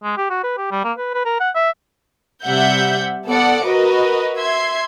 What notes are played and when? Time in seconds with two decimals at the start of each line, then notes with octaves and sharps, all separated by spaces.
0.03 G#3
0.17 G4
0.30 F#4
0.43 B4
0.58 G4
0.71 G3
0.84 A#3
0.98 B4
1.14 B4
1.25 A#4
1.40 F#5
1.55 E5
2.45 C3 G3 E5 F#5 G6
3.27 B3 A4 D5 F#5 D6 C#7
3.64 F#4 A#4 B4 D#5
4.37 E5 C6 G#6